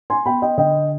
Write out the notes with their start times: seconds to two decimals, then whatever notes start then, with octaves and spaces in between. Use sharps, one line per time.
0.10 G#5 C6
0.25 B3 G5 B5
0.42 D#5 G5
0.57 D3 D#5 G5